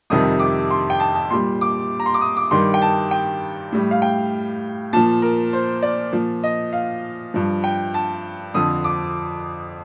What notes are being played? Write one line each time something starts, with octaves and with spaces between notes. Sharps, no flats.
F2 C3 D#3 G3 D#6
D6
C6
G5
A5
A5
A#2 G3 C6
D6
A#5
C6
D6
D#6
D6
G2 D#3 G3 C6
G5
A5
G5
A2 G3
F5
G5
A#2 F3 A5
A#4
C5
D5
A#2 F3
D#5
F5
G2 F3
G5
A5
F2 D3 F3 D#6
D6